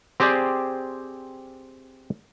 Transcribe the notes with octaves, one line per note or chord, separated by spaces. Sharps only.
C4 G4 G#4 C5 D5